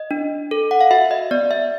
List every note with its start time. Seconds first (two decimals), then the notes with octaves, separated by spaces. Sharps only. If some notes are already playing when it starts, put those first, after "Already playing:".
Already playing: D#5
0.11 D4
0.51 A4
0.71 F#5
0.81 F5
0.91 F#4 E5
1.11 D#5
1.31 B3 D5
1.51 E5